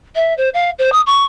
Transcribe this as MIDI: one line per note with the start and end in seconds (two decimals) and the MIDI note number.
0.15 0.33 76
0.37 0.49 72
0.54 0.70 77
0.78 0.92 72
0.92 1.01 87
1.06 1.24 85